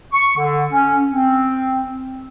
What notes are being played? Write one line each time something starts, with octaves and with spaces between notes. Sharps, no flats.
C#6
D3
C#4
C4